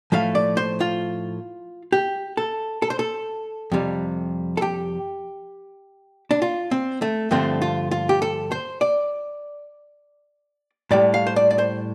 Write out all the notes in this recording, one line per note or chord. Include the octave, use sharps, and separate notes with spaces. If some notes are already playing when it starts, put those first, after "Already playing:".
A2 F3 A3 F5
D5
C5
F4
G4
A4
A4
C5
A4
F2 C3 G3
A4
G4
D4
F4
C4
A3
G2 D3 F3 A3 C4
F4
F4
G4
A4
C5
D5
A2 G3 D5
F5
C5
D5
D5
C5